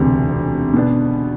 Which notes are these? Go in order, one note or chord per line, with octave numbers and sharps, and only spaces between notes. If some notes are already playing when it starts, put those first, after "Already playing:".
Already playing: E1 D2 C3
B2 B3 D4